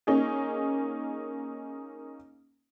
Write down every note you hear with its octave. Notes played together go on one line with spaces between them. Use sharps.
A#3 C#4 D#4 G#4